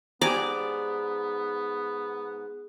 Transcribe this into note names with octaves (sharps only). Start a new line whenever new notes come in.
G#2 B3 G4 D5 G#5 A#5